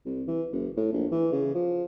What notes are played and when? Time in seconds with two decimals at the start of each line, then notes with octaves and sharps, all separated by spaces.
0.05 C2
0.28 E3
0.52 F#1
0.77 A2
0.92 A#1
1.11 E3
1.32 C#3
1.54 F3